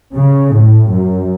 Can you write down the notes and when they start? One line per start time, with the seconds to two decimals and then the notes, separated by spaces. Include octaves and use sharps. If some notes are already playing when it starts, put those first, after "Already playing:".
0.13 C#3
0.52 A2
0.91 F#2